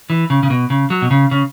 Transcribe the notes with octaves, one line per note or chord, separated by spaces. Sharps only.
E3
C#3
C#3
B2
C#3
F#3
B2
C#3
C#3